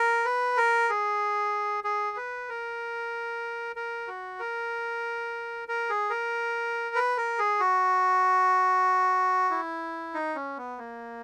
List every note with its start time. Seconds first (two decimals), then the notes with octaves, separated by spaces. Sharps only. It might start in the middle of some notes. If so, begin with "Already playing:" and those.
Already playing: A#4
0.25 B4
0.57 A#4
0.89 G#4
1.84 G#4
2.17 B4
2.49 A#4
3.76 A#4
4.08 F#4
4.39 A#4
5.68 A#4
5.90 G#4
6.10 A#4
6.95 B4
7.17 A#4
7.39 G#4
7.60 F#4
9.50 E4
10.14 D#4
10.35 C#4
10.57 B3
10.78 A#3